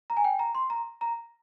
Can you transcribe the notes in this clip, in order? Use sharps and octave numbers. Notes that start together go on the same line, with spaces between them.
A#5
G#5
G5
A#5
C6
A#5
A#5